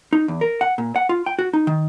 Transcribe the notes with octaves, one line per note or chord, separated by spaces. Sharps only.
D#4
E2
A#4
F#5
A#2
F#5
F4
G5
F#4
D#4
D#3